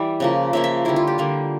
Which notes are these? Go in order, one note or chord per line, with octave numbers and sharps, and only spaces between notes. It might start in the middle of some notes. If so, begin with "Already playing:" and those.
Already playing: E3 G3 E4 D5 E5
C#3 F3 A#3
C#3 F3 A#3 E5
E5
D3 G3 A#3 E4
F4
G4
D3 G3 A#3